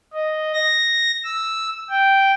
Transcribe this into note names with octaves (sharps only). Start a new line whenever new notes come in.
D#5
A#6
E6
G5